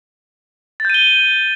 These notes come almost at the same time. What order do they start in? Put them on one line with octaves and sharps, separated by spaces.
A6 G6 D#7 G7